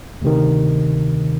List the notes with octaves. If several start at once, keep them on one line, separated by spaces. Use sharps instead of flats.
D2 C3 D#3